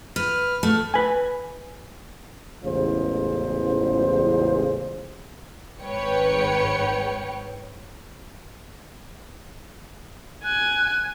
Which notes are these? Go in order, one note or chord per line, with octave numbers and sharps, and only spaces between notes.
B4 F6
A3
B4 G#5
A1 E2 C#3 G#3 F4 C5
G#1 G#2 B4 C#5 G5 C#7
G#5 F#6